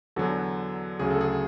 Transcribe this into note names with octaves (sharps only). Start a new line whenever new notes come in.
E2 D3 F#3 F#4 A4
D2 C#3 F#3 G#4
A4
G#4